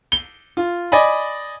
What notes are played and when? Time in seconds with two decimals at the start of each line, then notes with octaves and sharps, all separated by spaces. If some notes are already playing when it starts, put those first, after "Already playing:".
0.12 G7
0.57 F4
0.92 D5 D#5 G#5 B5